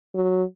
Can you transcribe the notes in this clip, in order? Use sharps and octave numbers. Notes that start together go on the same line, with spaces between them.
F#3